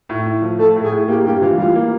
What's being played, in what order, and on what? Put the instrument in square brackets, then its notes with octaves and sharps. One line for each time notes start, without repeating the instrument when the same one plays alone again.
[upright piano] A2
A2
F3
[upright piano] A3 [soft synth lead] A4
[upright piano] A2
[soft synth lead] G#4
[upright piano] A2
[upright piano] A#3 [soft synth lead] G4
[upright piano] G2 [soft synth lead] G4
[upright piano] E3 [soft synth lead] F4
[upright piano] G3 [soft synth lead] F4
[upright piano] A#3